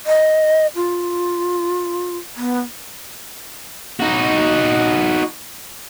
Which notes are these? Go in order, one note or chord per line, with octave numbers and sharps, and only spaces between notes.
D#5
F4
B3
D#4 F#4